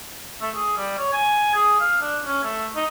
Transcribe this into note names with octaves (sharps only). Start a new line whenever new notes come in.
A3
G#4
G3
C#5
G#5
G#4
F5
D4
C#4
A3
D#4